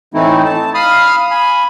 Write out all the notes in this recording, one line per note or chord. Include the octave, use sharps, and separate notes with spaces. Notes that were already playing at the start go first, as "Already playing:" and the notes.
A2 E3 A3 C4 D#4 E4
A5
F5 B5 D#6 F6
G#5 B5